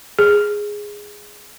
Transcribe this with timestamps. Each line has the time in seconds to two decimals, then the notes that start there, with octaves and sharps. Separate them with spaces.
0.19 G#4